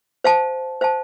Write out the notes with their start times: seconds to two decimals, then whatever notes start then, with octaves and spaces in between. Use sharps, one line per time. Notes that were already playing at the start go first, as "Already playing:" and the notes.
0.24 C5 F5 A5
0.81 C5 F5 A5